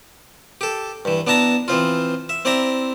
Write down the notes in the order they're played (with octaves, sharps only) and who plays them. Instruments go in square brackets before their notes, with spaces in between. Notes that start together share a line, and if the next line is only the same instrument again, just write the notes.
[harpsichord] G4 A4
G2 E3
B3 D4 E4 A5 A#5
E3 F3 C4 F4
E5
C4 E4 D5 E5 A#5